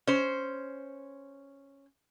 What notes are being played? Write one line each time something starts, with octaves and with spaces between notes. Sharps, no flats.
C#4 C5